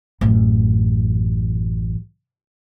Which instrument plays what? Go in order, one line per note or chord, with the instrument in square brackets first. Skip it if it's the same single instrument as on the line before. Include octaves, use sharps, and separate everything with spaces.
[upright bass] A1 F#2